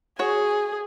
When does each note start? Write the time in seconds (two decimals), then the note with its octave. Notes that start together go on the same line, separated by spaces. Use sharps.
0.19 F#4 G#4 C#5